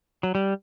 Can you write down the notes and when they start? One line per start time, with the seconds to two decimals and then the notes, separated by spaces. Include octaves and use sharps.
0.23 F#3
0.35 G3